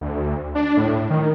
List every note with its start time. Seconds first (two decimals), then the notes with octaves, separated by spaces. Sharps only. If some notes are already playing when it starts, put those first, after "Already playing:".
0.01 D2
0.55 D4
0.77 A2
1.10 D#3